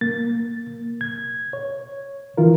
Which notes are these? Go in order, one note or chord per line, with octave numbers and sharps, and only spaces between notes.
A#3 A6
G#6
C#5
E3 F4 A#4